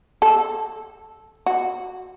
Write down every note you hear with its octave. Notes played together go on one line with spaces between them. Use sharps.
A4
F#4